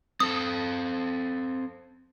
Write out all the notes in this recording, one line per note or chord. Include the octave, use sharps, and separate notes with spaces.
C4 A4 D#6